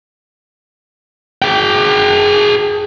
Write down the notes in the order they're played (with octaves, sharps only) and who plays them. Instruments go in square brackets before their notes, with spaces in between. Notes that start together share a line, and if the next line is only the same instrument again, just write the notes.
[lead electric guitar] G#4 G5